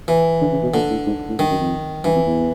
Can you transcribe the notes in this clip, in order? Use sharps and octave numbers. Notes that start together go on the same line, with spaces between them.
E3
D3
C#3
B2
A#2 D3
A2
G#2
A2
G2 D#3
F#2
F2
G2 E3
F2
E2